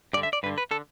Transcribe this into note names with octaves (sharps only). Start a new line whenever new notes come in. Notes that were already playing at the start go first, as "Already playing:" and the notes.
G2 D3 D5
E5
D5
G2 D3 B4
B4
D3 A4